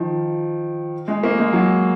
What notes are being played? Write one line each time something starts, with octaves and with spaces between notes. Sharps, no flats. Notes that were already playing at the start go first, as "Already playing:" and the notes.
Already playing: D#3 F3
G#3
A#3
G#3
F#3